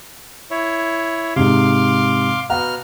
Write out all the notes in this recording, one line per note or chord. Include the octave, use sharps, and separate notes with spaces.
E4 C#5
G#2 C3 F5 C6 D6
B2 F5 F#5 A#5 F6